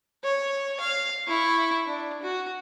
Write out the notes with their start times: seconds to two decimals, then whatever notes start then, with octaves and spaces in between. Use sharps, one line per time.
0.24 C#5
0.80 F5
1.28 E4 C#6
1.86 D4
2.22 F#4